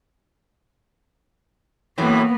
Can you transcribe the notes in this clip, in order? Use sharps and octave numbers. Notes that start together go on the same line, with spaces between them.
F#2 A2 E3 A#3 B3